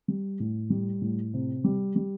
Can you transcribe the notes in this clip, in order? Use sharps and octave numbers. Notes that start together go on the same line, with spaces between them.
G3
A2
G3
A2
C3
G3
G3